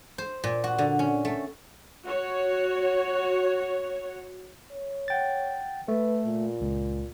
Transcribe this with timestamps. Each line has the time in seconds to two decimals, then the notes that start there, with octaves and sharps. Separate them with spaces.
0.18 C5
0.44 A#2
0.64 F#4
0.78 D3
0.99 C#4
1.25 A3
2.05 F#4 C#5
4.72 C#5
5.08 F#5 G5 A6
5.88 A3 B4
6.26 A#2
6.61 C#2